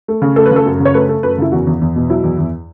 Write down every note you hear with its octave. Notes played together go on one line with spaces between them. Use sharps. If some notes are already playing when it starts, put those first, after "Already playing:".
A3
C#3
A3 A4
B4
C#3 A4
F#2
C#3
C#5
A3 B4
A3
F#2 B4
C#3 E4
E2 F#4
E2
E2
B2
F#3 E4
E2
E2